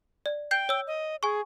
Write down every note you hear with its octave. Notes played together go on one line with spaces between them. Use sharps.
D5
G5 G6 C7
C#5 E6
D#5
G#4 G#5 C#6